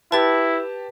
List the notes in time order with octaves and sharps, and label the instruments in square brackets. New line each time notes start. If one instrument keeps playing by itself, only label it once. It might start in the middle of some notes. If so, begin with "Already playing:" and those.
[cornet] E4 [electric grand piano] G4 A5 [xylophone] B4 A6